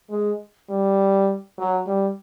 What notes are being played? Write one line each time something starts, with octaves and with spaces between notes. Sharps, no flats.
G#3
G3
F#3
G3